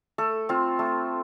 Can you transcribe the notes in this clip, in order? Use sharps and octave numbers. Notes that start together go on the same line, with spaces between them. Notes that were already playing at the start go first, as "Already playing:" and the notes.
A3 A4
C4 F4
A3